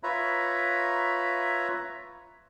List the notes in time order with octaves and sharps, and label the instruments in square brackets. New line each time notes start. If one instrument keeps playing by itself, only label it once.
[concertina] F4 B4 C#5 E5 A#5 B5